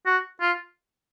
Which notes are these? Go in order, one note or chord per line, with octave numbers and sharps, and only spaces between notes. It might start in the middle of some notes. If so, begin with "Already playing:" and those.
F#4
F4